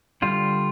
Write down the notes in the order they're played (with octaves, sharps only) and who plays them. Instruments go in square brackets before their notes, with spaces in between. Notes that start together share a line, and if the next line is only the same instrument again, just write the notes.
[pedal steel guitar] D3 G3 F4